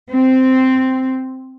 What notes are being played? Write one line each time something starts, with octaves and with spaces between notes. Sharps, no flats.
C4